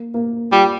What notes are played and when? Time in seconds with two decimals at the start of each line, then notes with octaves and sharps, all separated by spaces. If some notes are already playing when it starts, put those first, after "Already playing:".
Already playing: A#3
0.14 A#3
0.52 G3 F4